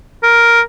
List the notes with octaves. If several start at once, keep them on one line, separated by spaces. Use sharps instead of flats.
A#4